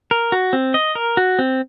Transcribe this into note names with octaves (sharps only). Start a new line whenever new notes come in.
A#4
F#4
C4
D#5
A#4
F#4
C4